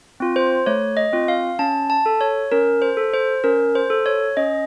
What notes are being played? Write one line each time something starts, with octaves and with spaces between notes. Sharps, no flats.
C4 F4
C5
A3 C#5
D#5
C4 F4
F5
C#4 A5
A5
A4
C#5
C#4 A#4
C5
A4
C5
C#4 A#4
C5
A4
C#5
C#4 D#5